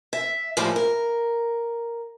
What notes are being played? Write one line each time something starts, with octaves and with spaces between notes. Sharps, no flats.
E5
A2 F3 G3 G#3 A#3
A#4